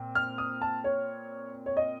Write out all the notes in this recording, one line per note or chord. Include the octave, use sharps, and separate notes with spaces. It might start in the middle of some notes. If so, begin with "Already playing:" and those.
Already playing: A#2 C4
F6
D#6
A5
C#5
C#5
D#5